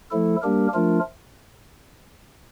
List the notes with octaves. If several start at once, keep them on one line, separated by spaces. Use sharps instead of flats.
F3 A3 E4 A4
G3 A#3 D4 G4 A#4
F3 A3 D4 F4 A#4